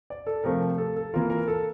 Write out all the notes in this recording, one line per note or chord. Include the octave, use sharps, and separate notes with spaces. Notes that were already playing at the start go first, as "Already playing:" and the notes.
D5
A4
C3 F3 A3 A#4
A4
A4
E3 A#3 F4 A#4
A#4
A4